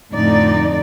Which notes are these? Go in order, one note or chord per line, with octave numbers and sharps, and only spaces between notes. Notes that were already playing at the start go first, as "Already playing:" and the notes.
F2 A2 D3 D#4 D5